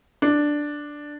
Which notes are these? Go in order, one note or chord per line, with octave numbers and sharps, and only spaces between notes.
D4